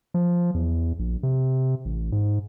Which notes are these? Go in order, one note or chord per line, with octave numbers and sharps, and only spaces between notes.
F3
E2
A#1
C3
A1
G#2